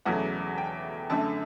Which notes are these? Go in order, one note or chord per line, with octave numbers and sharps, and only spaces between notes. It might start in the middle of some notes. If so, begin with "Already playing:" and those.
E1 E2 C#3 F#3 A3 F#5
G5
F#2 D3 A3 A5